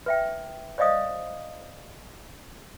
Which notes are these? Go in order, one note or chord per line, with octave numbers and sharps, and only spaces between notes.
B4 E5 G5
C5 D5 D#5 F5 D#6